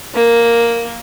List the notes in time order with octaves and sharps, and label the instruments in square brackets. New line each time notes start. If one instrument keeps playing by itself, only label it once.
[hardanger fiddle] A#3